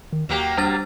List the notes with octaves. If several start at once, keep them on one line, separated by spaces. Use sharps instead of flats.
D#3
D#2 F#3 A#3 G4
G3 D4 A6